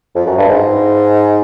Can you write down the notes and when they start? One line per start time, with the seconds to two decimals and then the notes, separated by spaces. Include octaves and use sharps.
0.15 F2
0.27 F#2
0.38 G2
0.49 G#2